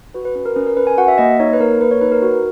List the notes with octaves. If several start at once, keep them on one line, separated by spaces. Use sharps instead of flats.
F#4 B4
B4
C#4 B4
A#4
C#4 B4
A#4
C#4 B4
G#5
F#4 F#5
E5
A#3 D#5
D#4 C#5
B4
A#3 A#4
A#3 B4
C#5
D#4 B4
A#4
F#4